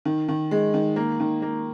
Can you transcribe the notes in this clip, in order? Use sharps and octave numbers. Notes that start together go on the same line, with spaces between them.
D#3
D#3
G#3
D#3
A#3
D#3
A#3